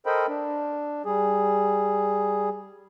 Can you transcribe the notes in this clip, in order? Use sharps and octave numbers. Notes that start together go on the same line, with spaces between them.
A4 A#4 C5 D#5 G5 B5
D4
G3 G#4